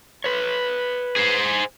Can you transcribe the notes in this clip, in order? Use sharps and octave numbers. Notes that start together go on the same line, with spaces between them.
B4 C#5
G#4 C5